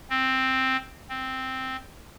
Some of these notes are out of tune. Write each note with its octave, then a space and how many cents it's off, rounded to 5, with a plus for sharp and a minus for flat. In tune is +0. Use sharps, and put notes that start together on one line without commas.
C4 +5
C4 +0